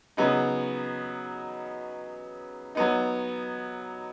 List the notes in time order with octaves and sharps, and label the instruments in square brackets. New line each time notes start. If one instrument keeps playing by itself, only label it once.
[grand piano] C#3 F#3 B3 D#4
F#3 B3 D#4